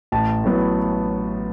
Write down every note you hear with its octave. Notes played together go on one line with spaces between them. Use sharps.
A1 A5
A2 F#3 B3